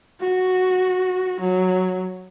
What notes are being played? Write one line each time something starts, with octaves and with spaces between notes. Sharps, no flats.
F#4
F#3